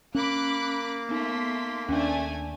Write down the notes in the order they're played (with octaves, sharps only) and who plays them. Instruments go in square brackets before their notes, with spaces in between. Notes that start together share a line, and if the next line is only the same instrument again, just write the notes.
[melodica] A#3 [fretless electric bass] C#4 [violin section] B5 D6 F#6
[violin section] A3 C6 B6 [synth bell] B3 D#4
[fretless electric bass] D#2 [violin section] A3 D5 G#5 [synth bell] C#4 D4